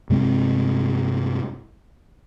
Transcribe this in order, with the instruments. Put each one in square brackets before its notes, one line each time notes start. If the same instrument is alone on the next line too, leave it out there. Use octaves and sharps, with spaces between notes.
[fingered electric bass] G2 C3 G#3 C4